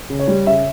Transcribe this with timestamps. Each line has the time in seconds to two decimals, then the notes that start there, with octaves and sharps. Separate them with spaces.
0.10 C#3
0.19 C#5
0.28 G3
0.47 C#3 E5